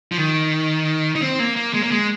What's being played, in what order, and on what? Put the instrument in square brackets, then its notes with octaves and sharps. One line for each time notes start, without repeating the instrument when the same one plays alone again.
[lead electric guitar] F3
D#3
D#4
C4
A#3
A#3
G#3
A#3
G#3